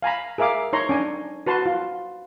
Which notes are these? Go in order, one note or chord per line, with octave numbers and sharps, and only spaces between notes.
F5 G#5 A#5 B5
G#4 A#4 E5 F5 D6
D#4 C#5 A#5 C6
C#4 D4 G#5
F#4 B4 A5 C6
F4